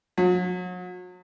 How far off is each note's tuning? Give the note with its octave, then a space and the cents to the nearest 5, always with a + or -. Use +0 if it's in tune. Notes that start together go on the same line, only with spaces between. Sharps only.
F#3 -40